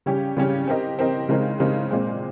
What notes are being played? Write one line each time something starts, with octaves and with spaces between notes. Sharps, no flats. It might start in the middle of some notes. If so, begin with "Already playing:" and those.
C#3 G3 C#4 G4
C#3 G3 C#4 G4
C4 G4 A#4 D#5
C4 G4 A#4 D#5
C#3 G#3 C4 D#4 A#4
C#3 G#3 C4 D#4 A#4
A#2 G#3 C4